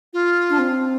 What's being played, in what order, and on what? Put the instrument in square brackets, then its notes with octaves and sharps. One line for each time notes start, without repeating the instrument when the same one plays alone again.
[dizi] F4
[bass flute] D4
C4